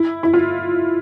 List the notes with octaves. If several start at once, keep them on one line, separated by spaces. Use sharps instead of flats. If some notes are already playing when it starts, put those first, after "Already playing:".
Already playing: E4
E4
F4